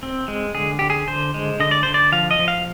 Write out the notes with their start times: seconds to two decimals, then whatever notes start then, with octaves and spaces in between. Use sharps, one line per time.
0.03 C4
0.28 G#3
0.54 D3 G#4
0.79 D3 G4
0.90 G#4
1.08 D3 C5
1.34 G#3
1.60 D3 D#5
1.71 D5
1.83 D3 C5
1.94 D5
2.12 F3 F5
2.31 D#5
2.39 F3
2.48 F5